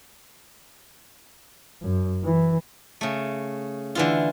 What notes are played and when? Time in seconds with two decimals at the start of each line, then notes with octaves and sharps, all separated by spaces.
1.82 F#2
2.24 E3
3.01 C#3 A3
3.95 D3 E3 F4